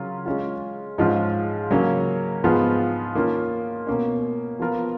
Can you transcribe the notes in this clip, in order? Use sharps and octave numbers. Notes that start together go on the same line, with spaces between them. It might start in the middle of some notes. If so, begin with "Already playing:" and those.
Already playing: C#3 F#3 C#4 F4 A#4
G#3 C#4 F4
G#2 F3 G#3 C#4 F4
C#3 F#3 A#3 C#4
G#2 F3 B3 F4 G#4
D#3 A#3 C#4 F4
B2 A#3 C#4
F3 B3 F4 A#4